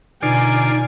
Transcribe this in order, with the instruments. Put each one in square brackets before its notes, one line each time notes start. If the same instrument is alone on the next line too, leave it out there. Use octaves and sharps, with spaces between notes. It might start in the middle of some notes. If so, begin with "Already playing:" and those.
[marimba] B2 [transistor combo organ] D3 F4 D5 [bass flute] D#4 [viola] G#5